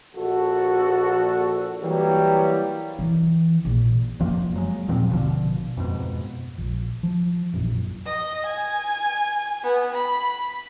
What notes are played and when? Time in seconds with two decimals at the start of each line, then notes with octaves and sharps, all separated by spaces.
0.16 A#1 F#4 A4
1.82 E3 F#3 G3 A#3
2.99 E3
3.65 A#1
4.20 F1 F#2 F3 A#3
4.56 F#3 G#3
4.88 D#2 A#2 F3 C4
5.11 G#1 B2 D3 F3
5.77 F2 G#2 B2
6.58 A#1
7.03 F3
7.53 E1 A#1 F#2
8.06 D#5
8.46 G#5
9.64 B3
9.94 B5